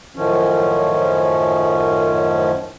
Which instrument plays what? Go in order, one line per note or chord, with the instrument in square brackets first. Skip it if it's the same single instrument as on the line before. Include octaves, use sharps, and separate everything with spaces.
[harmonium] F#2 A2 D#3 F3 C#4